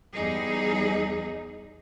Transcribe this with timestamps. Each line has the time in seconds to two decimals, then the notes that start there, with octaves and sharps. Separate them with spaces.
0.13 E2 G3 D#4 G#4